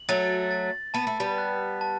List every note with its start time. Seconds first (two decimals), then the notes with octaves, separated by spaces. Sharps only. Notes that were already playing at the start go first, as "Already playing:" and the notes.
Already playing: F#7
0.09 F#3 A3 A6
0.51 A6
0.94 B3 A5
1.07 A3
1.20 G3 B3
1.38 F#6
1.81 A5